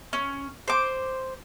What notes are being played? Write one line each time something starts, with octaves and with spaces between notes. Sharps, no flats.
C#4
C5 D6